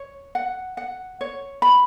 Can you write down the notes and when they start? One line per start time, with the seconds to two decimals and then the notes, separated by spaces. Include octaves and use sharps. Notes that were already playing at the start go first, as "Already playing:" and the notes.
Already playing: C#5
0.35 F#5
0.77 F#5
1.21 C#5
1.62 B5